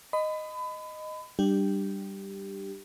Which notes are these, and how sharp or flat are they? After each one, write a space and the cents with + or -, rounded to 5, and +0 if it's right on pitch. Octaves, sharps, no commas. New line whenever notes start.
D#5 -5 B5 +30
G3 +0 D4 +20 G4 +0